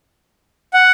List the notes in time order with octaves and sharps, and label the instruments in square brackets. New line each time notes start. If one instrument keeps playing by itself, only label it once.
[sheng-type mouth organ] F#5